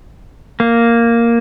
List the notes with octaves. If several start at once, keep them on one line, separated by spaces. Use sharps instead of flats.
A#3